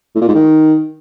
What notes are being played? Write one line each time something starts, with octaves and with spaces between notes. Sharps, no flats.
A2
A#2
G#2
D#3